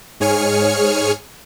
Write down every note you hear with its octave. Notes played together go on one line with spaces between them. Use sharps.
G#2 G#4 C#5 G#5 F6 C#7